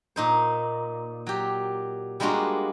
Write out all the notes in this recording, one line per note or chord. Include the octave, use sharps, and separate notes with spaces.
A#2 D#4 C5
F#3 G4
G3 G#3 A#3 D4 F4 F#4